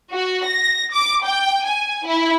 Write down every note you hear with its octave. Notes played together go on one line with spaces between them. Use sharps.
F#4
A#6
D6
G5
G#5
E4